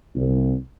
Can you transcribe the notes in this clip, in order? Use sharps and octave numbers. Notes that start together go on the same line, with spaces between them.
C2